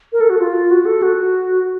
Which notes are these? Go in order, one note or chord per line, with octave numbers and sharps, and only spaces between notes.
A#4
A4
F#4
F4
F#4
A4
F#4